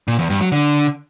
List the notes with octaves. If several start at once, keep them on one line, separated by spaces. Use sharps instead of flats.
A#2
E2
G2
F#3
D3